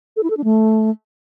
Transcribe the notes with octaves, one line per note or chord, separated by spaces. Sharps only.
A4
E4
A4
D4
A3